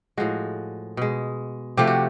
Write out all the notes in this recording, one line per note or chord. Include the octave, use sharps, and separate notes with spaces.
A2 F3 G#3 F#4
B2 G#3
C3 F3 A3 G4
F#4